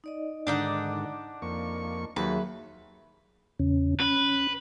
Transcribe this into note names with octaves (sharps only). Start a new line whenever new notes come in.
D#4 D5 D#5
G#2 D3 D#3 D4 D#4 D5 F#5 D6
F2 A#3 C#6
D#2 F#3 G#4 B4 E5
E2 C#3 C#4
C#4 B4